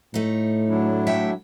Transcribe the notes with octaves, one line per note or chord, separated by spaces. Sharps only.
A2 A3 D#4
F#3 D4 E4
A3 E5 G5